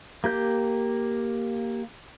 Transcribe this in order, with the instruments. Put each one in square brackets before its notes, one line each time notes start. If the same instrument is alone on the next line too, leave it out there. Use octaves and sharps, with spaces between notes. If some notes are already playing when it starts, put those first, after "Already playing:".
[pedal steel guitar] A#3 G4 G6